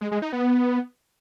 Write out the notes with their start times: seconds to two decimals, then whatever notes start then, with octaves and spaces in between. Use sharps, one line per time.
0.01 G#3
0.11 G#3
0.22 D#4
0.33 B3